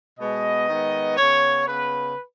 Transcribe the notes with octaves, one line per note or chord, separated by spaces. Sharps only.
B2 G#3 B3 D#5
D#3 G#3 B3
C#3 B3 C#5
C#3 B3 B4